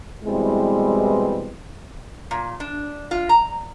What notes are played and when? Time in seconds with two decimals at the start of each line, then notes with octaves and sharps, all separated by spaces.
0.25 B2 E3 G3 G#3 C4 E4
2.31 A#2
2.60 D4
3.11 F4
3.29 A#5